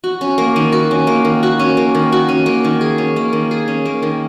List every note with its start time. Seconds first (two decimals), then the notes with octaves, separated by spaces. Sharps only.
0.04 F#4
0.21 C#4
0.38 A#3
0.56 D#3
0.72 F#4
0.91 C#4
1.07 A#3
1.25 D#3
1.43 F#4
1.60 C#4
1.77 A#3
1.95 D#3
2.12 F#4
2.29 C#4
2.46 A#3
2.64 D#3
2.81 G#4
2.98 C#4
3.16 A#3
3.33 D#3
3.51 G#4
3.68 C#4
3.85 A#3
4.03 D#3